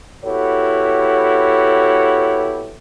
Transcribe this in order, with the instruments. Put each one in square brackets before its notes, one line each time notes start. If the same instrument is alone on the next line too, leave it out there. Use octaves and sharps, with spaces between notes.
[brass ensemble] B3 E4 F#4 G4 A4 C#5